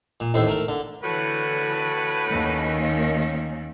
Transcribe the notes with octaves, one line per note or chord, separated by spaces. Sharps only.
A#2
A1 D#2 A2 C5 E5
A3 A#4
D3
A2 D3 E3 F#4 B4
D#2 D#3 C#4